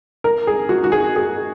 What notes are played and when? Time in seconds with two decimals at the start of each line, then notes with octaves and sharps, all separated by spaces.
0.24 A#4
0.47 G#4
0.69 F#4
0.84 F#4
0.92 G#4
1.16 G#4